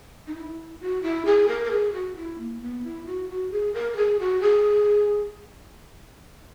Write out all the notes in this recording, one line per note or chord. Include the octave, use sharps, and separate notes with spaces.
D#4
E4
F#4
E4
G#4
A#4
A#4
G#4
F#4
E4
A#3
B3
E4
F#4
F#4
G#4
A#4
A#4
G#4
F#4
G#4